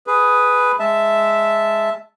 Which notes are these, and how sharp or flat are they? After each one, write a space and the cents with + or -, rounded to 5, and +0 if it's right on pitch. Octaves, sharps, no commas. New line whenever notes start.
G#4 +5 B4 +0
G#3 +0 E5 +0 A5 +0